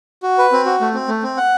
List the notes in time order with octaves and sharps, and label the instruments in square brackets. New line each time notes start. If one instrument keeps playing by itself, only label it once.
[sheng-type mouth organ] F#4
B4
C4
F#4
A3
C4
A3
C4
F#5